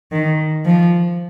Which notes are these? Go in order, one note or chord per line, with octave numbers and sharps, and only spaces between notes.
D#3
F3